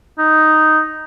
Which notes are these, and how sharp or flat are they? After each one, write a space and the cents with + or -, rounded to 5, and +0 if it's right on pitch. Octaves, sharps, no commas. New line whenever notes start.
D#4 +0